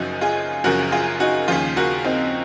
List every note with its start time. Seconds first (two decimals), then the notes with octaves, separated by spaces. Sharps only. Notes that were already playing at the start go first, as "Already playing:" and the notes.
Already playing: F#1 F#2 C#3 F3 D#4 F#4
0.21 F4 G#4
0.64 F#1 F#2 C#3 F3 F#4 A#4
0.92 F4 G#4
1.20 D#4 F#4
1.48 D#2 C#3 F3 F4 G#4
1.76 F#4 A#4
2.04 C4 D#4